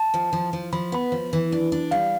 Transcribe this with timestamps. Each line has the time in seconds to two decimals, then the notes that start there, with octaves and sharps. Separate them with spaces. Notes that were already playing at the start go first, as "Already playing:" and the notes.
Already playing: A5
0.14 F3
0.33 F3
0.53 F3
0.73 F3 B5
0.92 B3 B5
1.12 F3
1.33 E3
1.52 D4
1.72 D4
1.91 G3 F5